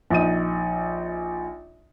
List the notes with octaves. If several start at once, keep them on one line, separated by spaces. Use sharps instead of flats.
A#1 D#4 D#7